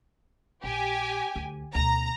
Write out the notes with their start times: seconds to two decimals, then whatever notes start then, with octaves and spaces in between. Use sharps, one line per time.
0.64 A#1 G4 G#5
1.36 D2
1.75 D2 B2 A#5